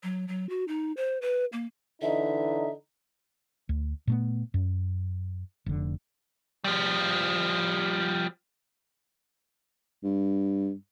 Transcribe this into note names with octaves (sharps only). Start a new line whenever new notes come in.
F#3
F#3
F#4
D#4
C5
B4
A#3
D3 E3 D#4 E5
D2
A#2 A3 B3
F#2
F1 D3
F3 G3
G2